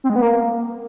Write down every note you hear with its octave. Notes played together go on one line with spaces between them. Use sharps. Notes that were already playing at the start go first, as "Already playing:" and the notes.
C4
G#3
B3
A#3